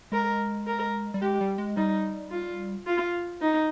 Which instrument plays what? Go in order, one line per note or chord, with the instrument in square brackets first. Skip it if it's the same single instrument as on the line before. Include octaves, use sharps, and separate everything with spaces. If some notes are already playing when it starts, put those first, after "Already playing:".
[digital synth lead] G#3 [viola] A#4
[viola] A#4
[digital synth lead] G3
[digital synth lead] G#3 [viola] G4
[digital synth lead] G3
G#3
[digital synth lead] G3 [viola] D#4
[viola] F4
F4
D#4